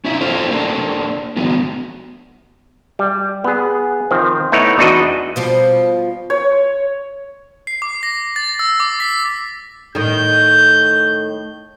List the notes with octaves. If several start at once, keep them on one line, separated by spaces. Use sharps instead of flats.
C#4 D#4 E4 E5
F4 A4 C5 C#5 D#5 F5
A#3 C#4 D4 E4 G4 A4
D3 E3 F#3 G3 B3
G3
B3 G#4
D#3 F3 C4
A3 B3 D#4 E4 C#5
E2 D4 D#4 F#4 B4 D#5
B2 F3 G3
C#5
C7
D6
A#6
A6
E6
D6
B6
A2 D#3 G6